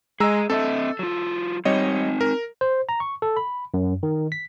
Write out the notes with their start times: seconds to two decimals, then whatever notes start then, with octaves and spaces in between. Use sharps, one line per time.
0.20 G#3 G#4 D#5 A#5 E6
0.50 C4 A4 D#5 E5
0.99 F#3 F4
1.65 G3 C4 D#4 C#5 D#5
2.21 A#4
2.61 C5
2.89 A#5
3.00 C#6
3.22 A4
3.37 B5
3.74 F#2
4.03 D#3
4.32 B6